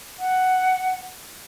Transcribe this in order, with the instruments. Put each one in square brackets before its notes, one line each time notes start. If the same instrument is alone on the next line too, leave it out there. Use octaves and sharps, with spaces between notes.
[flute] F#5